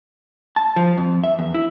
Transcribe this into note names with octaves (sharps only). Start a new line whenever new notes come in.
A5
F3
F2
E5
E2
E4